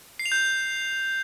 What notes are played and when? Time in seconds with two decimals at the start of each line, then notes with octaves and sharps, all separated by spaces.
0.19 C7
0.26 F7
0.32 G6